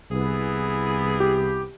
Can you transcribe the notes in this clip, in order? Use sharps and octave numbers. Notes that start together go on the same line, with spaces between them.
C2 E3 B3 G#4
G4